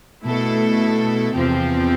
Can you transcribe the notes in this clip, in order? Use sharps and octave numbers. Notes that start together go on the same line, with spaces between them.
B2 A3 E4 A4
E2 C3 F3 C4 G4